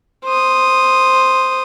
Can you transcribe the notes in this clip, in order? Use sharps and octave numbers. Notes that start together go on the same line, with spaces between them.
C5 D#6